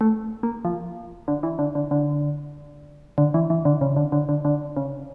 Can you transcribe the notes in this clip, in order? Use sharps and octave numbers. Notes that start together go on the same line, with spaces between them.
A3
A#3
F3
D3
E3
D3
D3
D3
D3
E3
E3
D3
C#3
D3
D3
D3
D3
C#3